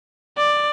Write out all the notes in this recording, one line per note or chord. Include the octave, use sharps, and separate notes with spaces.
D5